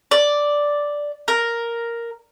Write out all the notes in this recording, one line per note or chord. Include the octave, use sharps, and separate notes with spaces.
D5
A#4